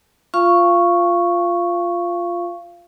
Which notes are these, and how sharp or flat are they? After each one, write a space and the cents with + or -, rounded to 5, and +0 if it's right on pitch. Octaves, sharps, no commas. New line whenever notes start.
F4 +0 F5 -20 C#6 +0